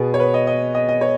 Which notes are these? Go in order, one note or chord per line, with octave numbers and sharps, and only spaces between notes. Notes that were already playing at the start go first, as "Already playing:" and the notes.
Already playing: B2 B3 G#4
C#5
B4
D#5
D#5
D#5
D#5
C#5